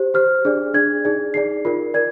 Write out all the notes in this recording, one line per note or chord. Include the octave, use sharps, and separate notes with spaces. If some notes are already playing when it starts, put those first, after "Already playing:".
Already playing: G4 C5
G4 C5 F6
D4 G#4 D5
D4 G#4 D5 G#6
D#4 G#4 D5
D#4 G#4 D5 C7
F4 A#4 D5
A#4 D5 G#6